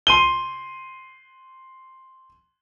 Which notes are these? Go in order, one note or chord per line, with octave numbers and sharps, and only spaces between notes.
C6 D#7 G7